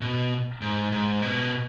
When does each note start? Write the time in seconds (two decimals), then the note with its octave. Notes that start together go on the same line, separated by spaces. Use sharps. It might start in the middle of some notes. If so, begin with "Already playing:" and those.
0.01 B2
0.61 G#2
0.92 G#2
1.22 B2